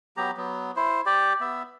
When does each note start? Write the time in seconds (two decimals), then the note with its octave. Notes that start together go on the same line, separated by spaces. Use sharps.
0.17 F#3 B3 G4 A#5
0.37 F#3 B3
0.76 E4 C5
1.06 G4 D5
1.41 B3 E5